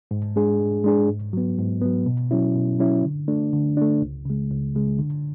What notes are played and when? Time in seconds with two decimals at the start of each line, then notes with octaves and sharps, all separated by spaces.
0.11 G#2
0.36 G#3 D4 G#4
0.59 G#2
0.84 G#3 D4 G#4
1.09 G#2
1.33 F#3 B3
1.58 G#2
1.82 F#3 B3
2.06 B2
2.31 F#3 C#4 E4
2.55 B2
2.79 F#3 C#4 E4
3.04 D3
3.28 A3 D4
3.53 D3
3.77 A3 D4
4.02 C#2
4.25 C#3 G#3
4.50 C#2
4.75 C#3 G#3
4.99 D3